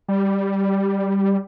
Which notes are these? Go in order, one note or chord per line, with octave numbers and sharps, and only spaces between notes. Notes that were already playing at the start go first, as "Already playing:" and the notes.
G3